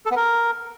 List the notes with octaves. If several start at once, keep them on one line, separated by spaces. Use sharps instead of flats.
A4
B3
A#4